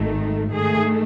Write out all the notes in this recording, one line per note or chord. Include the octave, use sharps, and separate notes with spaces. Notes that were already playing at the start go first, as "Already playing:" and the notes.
Already playing: G#1 G#2 D#3 A3
G#2 D#3 A3 G#4